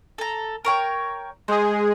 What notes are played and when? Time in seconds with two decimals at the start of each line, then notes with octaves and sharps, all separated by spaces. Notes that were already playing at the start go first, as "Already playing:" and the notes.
0.18 A4 A#5
0.65 A#4 C#5 G5
1.48 G#3 G#4 C5